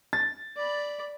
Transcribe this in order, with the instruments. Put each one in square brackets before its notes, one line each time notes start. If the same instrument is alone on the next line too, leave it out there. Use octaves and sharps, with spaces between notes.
[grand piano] A6
[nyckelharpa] D5 B5